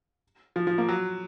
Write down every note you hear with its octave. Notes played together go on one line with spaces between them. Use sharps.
F3
F3
A#3
F#3